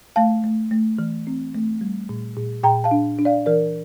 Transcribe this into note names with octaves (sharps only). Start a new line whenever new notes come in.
A3 F5 A5
A3
A3
E3
C4
A3
G3
A#2
A#2
A#2 G5 A#5
F5 A5
D4
D4
D5 F5
E3 A#4 D5